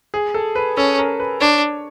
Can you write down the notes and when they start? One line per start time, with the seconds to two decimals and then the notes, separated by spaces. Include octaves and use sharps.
0.14 G#4
0.34 A4
0.55 B4
0.77 C#4 A4
0.99 A#4
1.20 B4
1.40 D4 C#5